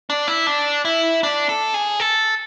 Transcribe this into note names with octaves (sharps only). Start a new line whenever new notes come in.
D4
E4
D4
E4
D4
A4
G#4
A4